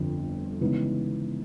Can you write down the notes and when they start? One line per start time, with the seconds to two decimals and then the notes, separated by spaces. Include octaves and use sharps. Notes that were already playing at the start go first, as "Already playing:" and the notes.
Already playing: G1 F2 D3
0.61 C#3 E3 G#3 B3 D#4